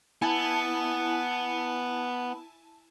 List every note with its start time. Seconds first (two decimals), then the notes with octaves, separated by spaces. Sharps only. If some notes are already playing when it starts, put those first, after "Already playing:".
0.22 B3 E4 G#5 A5